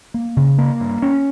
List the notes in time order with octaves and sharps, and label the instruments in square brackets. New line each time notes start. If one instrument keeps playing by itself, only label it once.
[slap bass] A#3
C#3
A#3
G2
C#4